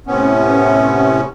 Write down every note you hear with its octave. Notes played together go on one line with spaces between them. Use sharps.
A2 C3 B3 C#4